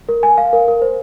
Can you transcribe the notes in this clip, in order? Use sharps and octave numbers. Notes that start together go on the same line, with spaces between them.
A#4
G#5
F5
A#4
A#4
C5